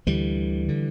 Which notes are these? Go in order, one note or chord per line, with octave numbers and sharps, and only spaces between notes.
D2 D3 E3 G3
D3